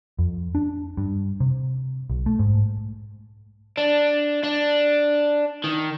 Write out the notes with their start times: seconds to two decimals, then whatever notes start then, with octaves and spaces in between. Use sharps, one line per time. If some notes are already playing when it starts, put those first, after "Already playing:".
0.19 F2
0.55 D4
0.97 G2
1.40 C3
2.10 B1
2.26 A3
2.39 G#2
3.77 D4
4.43 D4
5.64 D#3